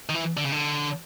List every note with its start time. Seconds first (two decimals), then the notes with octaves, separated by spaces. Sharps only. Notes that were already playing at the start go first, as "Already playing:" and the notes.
0.09 D#3
0.15 E3
0.37 D3
0.45 C#3
0.52 D3